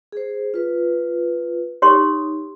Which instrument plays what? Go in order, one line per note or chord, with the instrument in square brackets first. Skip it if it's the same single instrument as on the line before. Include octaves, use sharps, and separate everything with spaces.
[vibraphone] G#4 C5
F4 B4
[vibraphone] D#4 [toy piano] G4 C#5 C6